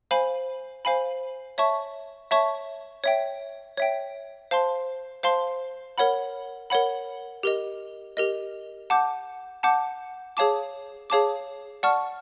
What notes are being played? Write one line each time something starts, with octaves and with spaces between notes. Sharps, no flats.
C5 F5 G#5 B5
C5 F5 G#5 B5
C#5 E5 A5 C#6
C#5 E5 A5 C#6
C#5 E5 G5
C#5 E5 G5
C5 F5 A5 C6
C5 F5 A5 C6
A#4 C#5 F#5 B5
A#4 C#5 F#5 B5
G4 A#4 D#5
G4 A#4 D#5
F#5 A5 D6 G6
F#5 A5 D6 G6
G#4 C#5 F5 A5 D6
G#4 C#5 F5 A5 D6
D5 F#5 A5 C#6 F6